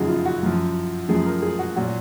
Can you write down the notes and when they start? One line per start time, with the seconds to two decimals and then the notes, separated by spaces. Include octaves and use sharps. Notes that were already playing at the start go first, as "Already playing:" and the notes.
Already playing: F#2 C#3 F3 D#4 F#4 G#4
0.08 F4
0.26 F#4
0.43 F#2 F3
1.09 F#2 F3 G#4
1.26 A#4
1.42 G#4
1.59 F#4
1.76 A#2 F#3 F#4